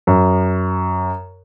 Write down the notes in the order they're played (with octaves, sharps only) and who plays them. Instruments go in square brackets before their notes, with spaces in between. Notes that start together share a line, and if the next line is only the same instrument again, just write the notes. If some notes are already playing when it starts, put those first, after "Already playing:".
[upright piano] F#2